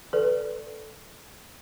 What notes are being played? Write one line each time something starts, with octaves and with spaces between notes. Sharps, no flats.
A4 B4 D5